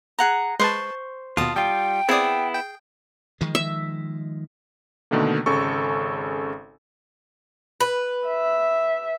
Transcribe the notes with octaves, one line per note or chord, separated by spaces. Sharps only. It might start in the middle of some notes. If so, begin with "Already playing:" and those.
G#4 F#5 A#5
G#3 B4 C5 A5 C#6
D#2 B2 F4 A5 D#6
G3 F4 G5
B3 C4 E4 G#4 D5 D#6
G5
D#3 F3 G#3
E5
B2 D3 D#3 A3 A#3
G#1 C#3 A4 C#6
B4
E5